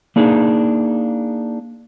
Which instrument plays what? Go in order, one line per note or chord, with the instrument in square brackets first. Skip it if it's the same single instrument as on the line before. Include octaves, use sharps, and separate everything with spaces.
[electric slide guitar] A#3 D4 D#4 G#4